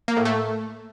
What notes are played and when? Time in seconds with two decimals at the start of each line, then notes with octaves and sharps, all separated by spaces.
0.08 A#3
0.17 A2
0.25 A3